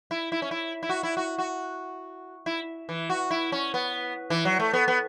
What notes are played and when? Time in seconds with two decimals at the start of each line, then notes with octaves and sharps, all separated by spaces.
0.11 E4
0.32 E4
0.42 C#4
0.51 E4
0.83 E4
0.89 F#4
1.03 E4
1.17 F#4
1.38 F#4
2.46 E4
2.89 E3
3.10 F#4
3.31 E4
3.52 C#4
3.74 B3
4.30 E3
4.45 F#3
4.60 A3
4.73 B3
4.88 B3